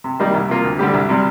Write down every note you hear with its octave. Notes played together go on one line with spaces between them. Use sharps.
C3
D#3 G3 A#3
C2
C3 F3 A#3 F4
D2
D3 G3 D4 G4
C2
C3 G3